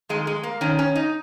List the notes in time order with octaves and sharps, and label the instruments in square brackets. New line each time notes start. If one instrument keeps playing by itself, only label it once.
[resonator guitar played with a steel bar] F2 D#3 G#3
G#3
A#3
F2 D#3 C#4
C#4
D#4